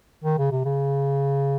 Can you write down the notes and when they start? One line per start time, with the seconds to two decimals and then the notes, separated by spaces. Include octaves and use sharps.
0.24 D#3
0.38 C#3
0.51 C3
0.65 C#3